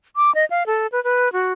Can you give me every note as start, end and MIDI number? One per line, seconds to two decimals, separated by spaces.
0.16 0.33 86
0.35 0.45 75
0.50 0.63 77
0.67 0.87 69
0.92 1.03 71
1.04 1.32 71
1.33 1.53 66